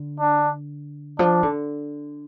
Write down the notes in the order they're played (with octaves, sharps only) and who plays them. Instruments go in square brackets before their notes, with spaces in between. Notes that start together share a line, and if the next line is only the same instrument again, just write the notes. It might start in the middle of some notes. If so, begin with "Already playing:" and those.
Already playing: [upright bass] D3
[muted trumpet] D4
[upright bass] F3 [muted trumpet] D4
[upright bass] D3